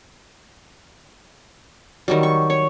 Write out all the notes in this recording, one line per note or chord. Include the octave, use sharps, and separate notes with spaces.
D#3 F#3 G3
C#6
C#5